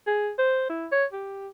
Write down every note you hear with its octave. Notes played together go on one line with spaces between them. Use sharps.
G#4
C5
E4
C#5
G4